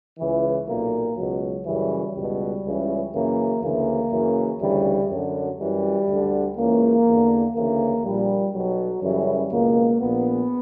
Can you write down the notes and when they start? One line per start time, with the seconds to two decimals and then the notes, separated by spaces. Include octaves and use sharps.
0.19 C#2 C#3 E3
0.68 B1 A#2 A#3
1.17 C#2 B2 F#3
1.66 F#2 C#3 E3 G3
2.15 C#2 B2 G3
2.64 C#2 C#3 E3
3.13 F#2 C#3 E3 A#3
3.62 D2 C#3 E3 A#3
4.11 F#2 C#3 E3
4.61 D2 C#3 E3 G3
5.10 F#2 D3 F#3
5.59 F#2 E3 G3
6.08 D2 D3
6.57 C#2 C#3 E3 A#3
7.06 E2 D3
7.56 D2 C#3 E3 A#3
8.04 A#1 A#2 G3
8.54 B1 B2 F#3
9.03 F#2 C#3 E3 G3
9.52 C#2 B2 A#3
10.01 A#1 A#2 B3